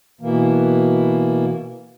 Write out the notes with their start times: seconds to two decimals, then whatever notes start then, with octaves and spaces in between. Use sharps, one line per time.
0.21 B2 E3 A#3